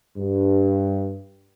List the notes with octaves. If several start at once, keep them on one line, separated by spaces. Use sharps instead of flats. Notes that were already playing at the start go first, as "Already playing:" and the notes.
G2